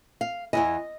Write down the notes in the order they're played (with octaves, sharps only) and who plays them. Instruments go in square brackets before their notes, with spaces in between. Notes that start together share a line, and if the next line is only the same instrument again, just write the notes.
[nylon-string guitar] F5
E2 C#3 E3 D#5